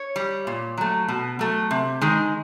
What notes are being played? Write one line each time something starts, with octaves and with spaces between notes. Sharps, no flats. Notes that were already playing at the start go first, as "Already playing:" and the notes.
Already playing: C#5
G3
A#2
F#3 A3
B2
F#3 A3
C3
D#3 G#3